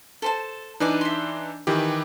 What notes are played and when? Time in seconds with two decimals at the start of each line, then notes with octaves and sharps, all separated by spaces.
0.22 A4 C5 A5
0.80 E3 D4 D#4 B4 G#5 D6
1.01 E5 C6
1.67 D#3 E3 G4 B4